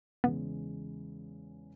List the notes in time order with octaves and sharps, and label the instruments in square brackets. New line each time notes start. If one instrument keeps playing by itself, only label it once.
[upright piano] E2 C#3 E3 G#3 [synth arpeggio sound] B3